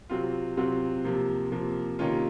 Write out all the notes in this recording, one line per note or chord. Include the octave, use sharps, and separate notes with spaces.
C3 F#3 C4 F4
C3 F#3 C4 F4
C3 F3 A#3
C3 F3 A#3
C3 D#3 A#3 C#4 F4